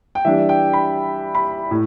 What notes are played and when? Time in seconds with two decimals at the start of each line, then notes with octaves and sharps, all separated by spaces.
0.15 G5
0.25 E3 G3 D4 E5
0.49 G5
0.73 B5
1.35 B5
1.71 A2